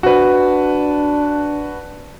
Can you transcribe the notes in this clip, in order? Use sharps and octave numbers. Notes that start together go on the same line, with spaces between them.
D4 F#4 B4